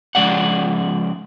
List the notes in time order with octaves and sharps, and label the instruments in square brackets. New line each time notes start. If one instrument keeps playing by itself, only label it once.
[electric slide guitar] C#3 F3 G#3 D5 F#5